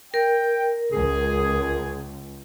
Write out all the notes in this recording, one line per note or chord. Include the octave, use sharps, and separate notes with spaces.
A#4 G5
C#2 G#4